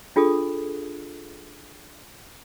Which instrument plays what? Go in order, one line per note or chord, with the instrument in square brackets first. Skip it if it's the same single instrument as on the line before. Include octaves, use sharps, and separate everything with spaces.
[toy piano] D4 F4 G#4 A4 D#6